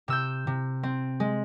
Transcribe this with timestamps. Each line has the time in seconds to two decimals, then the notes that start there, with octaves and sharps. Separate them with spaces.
0.08 C3 E6 G6
0.47 C3
0.83 C4
1.20 G#3